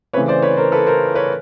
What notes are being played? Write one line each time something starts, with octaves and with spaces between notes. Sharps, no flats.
C#3 E3 A3 C4 B4 C#5
C5 D5
B4 C#5
A#4 C5
A4 B4
A#4 C5
B4 C#5